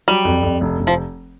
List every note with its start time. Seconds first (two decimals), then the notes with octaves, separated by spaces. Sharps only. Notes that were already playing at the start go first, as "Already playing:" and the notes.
0.08 F#3 G3
0.25 F2
0.43 F2
0.61 F1
0.79 F1
0.87 F3